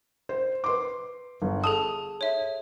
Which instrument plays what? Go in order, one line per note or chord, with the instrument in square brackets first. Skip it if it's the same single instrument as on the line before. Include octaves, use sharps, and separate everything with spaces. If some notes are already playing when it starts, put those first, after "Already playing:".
[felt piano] C5
B4 C6 D6
G1
[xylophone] G#4 A4 A5 [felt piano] D#6
[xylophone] C#5 E5